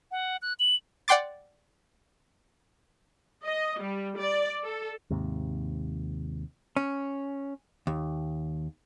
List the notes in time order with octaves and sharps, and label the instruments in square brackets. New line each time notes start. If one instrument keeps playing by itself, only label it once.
[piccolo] F#5
F#6
F#7
[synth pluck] D5 F#5 G5 C6 D6 A6
[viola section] D#5
G3
D5
A4
[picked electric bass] D#2 G#2 C3
[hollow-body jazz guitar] C#4
D#2